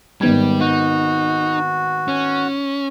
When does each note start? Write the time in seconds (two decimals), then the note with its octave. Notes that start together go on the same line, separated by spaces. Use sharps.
0.21 G#1 G3 B3 G#6
0.61 D#4 F#4
2.08 C#4